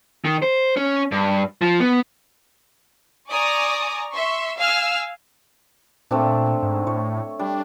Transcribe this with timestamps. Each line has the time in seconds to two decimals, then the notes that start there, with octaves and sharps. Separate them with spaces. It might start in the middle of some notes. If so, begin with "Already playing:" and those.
0.25 D#3
0.42 C5
0.77 C#4
1.12 G2
1.62 F3
1.80 B3
3.30 D5 G#5 A#5 C#6 D#6
4.12 E5 C6 C#6
4.58 F5 G#5 E6 F6
6.11 A#2 A3 C4 D4
6.62 G#2
6.87 A2 C#5
7.39 G3 D4